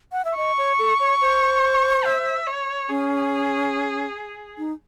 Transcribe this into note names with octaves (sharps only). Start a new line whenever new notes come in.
F#5
E5
D#5 C#6
C#5
A4
C#5
C5
E5
C#5
C#4 G#4
D#4